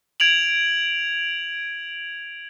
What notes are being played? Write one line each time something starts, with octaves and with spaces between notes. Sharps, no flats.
G#6 D7 F7 F#7